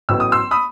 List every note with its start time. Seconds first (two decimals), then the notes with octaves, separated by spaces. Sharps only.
0.09 A1 A2 F#3 B3 E6
0.20 D#6
0.32 C6 E6
0.51 B5 D#6